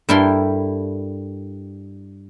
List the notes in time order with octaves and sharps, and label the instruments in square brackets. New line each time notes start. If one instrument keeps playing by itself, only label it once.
[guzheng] G2 G3 E4 A4 A#4 C6